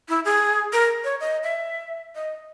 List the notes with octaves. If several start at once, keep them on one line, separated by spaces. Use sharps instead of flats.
E4
G#4
A#4
C#5
D#5
E5
D#5